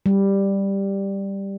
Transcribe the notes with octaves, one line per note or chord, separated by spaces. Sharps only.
G3